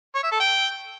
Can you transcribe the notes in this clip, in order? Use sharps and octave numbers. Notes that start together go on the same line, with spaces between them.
C#5
E5
A4
G5